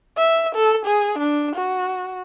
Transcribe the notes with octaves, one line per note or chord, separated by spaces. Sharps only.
E5
A4
G#4
D4
F#4